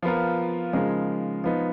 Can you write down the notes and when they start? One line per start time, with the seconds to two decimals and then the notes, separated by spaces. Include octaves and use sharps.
0.03 F3 B3 F4 A#4
0.73 C#3 F3 G#3 D#4 A#4
1.44 F3 B3 D#4